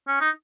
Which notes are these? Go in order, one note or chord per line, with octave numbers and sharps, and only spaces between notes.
C#4
D#4